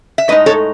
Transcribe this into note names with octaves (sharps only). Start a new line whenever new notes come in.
E5
A2 G#3 D#4 B4 D#5
A4 C#5